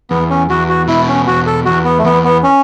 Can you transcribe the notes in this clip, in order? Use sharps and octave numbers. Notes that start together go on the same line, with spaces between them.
E2 B3
C#4
E2 F#4
F#4
B2 E4
C#4
E2 F#4
A4
E2 F#4
B3
A3
E2 B3
B3
C#4